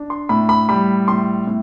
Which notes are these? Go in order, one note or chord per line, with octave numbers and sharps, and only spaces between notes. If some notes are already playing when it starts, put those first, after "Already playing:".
Already playing: D4
C6
A2 B5
B5
G3 B5
A2 C6
A2